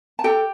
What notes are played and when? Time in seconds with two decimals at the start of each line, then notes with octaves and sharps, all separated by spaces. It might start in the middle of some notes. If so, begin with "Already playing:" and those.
0.19 A5
0.24 G4 A4 G5